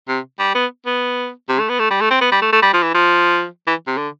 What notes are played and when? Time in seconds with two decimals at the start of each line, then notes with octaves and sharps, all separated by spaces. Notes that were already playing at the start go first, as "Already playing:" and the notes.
0.08 C3
0.39 G3
0.55 B3
0.86 B3
1.49 C3
1.59 A3
1.69 B3
1.79 A3
1.91 G3
2.01 A3
2.11 C4
2.21 B3
2.32 G3
2.42 A3
2.52 A3
2.62 G3
2.74 F3
2.83 E3
2.95 F3
3.67 E3
3.87 C3
3.98 D3